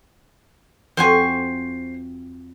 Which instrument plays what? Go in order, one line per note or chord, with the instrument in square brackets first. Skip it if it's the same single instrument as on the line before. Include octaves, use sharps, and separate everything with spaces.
[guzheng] F2 F#4 G#5 [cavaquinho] C5 C#6